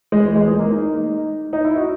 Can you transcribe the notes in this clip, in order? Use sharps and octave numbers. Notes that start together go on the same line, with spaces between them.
G#3
E3
G#3
G#3
A#3
D#4
D#4
E4
F#4